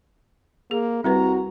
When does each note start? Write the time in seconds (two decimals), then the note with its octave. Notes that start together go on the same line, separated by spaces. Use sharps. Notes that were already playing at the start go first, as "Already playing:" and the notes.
0.71 A#3 G#4
1.04 C2 G3 F#4 A#4 B4 A#5